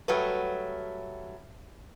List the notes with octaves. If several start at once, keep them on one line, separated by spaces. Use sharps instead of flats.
F#3 G3 A3 B4